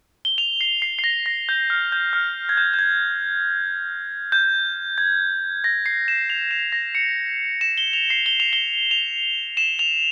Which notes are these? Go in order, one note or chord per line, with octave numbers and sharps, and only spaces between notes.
G7
F7
C7
C7
C7
A#6
A#6
G6
F6
G6
F6
G#6
G6
G6
G#6
G6
G#6
A#6
C7
E7
F7
E7
A#6
C#7
E7
G7
F7
C7
G7
F7
G7
F7
E7
F7